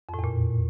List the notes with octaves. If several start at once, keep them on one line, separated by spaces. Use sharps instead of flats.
F2
A2
E2
A#2